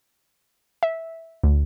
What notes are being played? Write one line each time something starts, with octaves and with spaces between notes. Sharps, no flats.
E5
D2